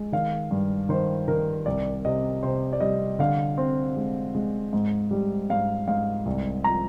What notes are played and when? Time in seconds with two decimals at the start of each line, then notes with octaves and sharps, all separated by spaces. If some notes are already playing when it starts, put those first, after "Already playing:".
Already playing: G#3
0.12 D#3 F5
0.51 G2
0.89 D#3 C5
1.28 D#3 A#4
1.66 C2 D5
2.05 C3 D#5
2.43 C3 C5
2.73 D5
2.81 G3 D#5
3.19 D3 F5
3.58 C4
3.97 G#3
4.35 G#3
4.73 G#2
5.11 G3
5.50 G#2 F5
5.88 G#2 F5
6.26 C2
6.64 F3 A#5